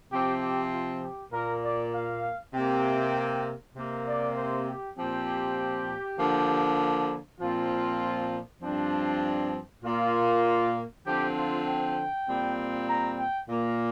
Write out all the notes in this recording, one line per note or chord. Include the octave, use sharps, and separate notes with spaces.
C3 F3 C4 G4
G4
F4
G4
A#2 A#3 A#4
D5
F5
C3 A#3 G5
C3 A#3
D5
C5
G4
A#2 F3 C4 G4
D3 F3 A#3
A#2 F3 C4 F4
G2 F3 C4 D4
A#2 A#3 F4
D3 F3 C4 G4
F4
G5
A#2 G3 C4
A#5
G5
A#2 A#3